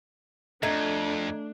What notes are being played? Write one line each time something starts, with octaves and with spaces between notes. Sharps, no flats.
F2 A3 D4 D#5 A#5 G#6